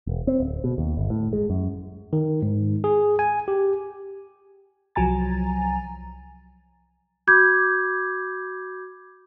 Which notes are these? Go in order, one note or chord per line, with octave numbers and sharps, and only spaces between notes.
E1
C4
D1
B2
D#2
G1
A2
G#3
F#2
D#3
G#2
G#4
G#5
G4
C2 F3 F#3 G#5 A#5 A6
F#4 B5 D6 G6 G#6